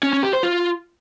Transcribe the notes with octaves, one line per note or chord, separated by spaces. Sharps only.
C#4
C#4
G4
C5
F4